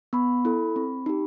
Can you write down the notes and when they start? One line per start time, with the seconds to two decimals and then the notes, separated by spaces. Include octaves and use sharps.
0.13 B3 B5
0.45 E4 A4
0.76 C4
1.06 D#4 G4